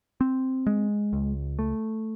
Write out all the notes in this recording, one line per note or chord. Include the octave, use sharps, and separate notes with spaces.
C4
G#3
C#2
A3